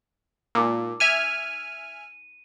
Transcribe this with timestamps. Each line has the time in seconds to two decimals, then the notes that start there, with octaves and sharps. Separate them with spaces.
0.55 A#2 D#4 D6 E6
1.00 E5 G#5 F6 D#7